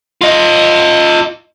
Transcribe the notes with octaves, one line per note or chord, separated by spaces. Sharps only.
F4 D#5